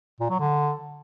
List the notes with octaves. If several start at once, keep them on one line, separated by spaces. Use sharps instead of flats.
A#2
F#3
D3